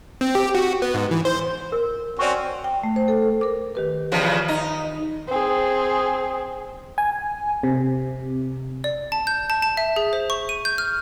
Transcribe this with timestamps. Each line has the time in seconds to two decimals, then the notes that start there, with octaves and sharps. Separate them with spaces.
0.21 C4
0.35 G4
0.55 F#4
0.82 B3
0.94 G#2
1.11 E3
1.25 C5
1.72 A#4
2.19 C4 C#4 F#4 D5 C#6
2.64 G5
2.83 A3
2.96 C5
3.08 A4
3.41 A#4 D6
3.75 D#3 G4 B4
4.12 E2 C#3 F3
4.48 D#4
5.28 C4 G#4
6.98 G#5
7.63 C3
8.84 D5
9.12 A5
9.27 G6
9.50 A5
9.62 A5
9.77 E5
9.96 G#4
10.13 C5
10.30 C#6
10.49 D#7
10.65 G6
10.78 F6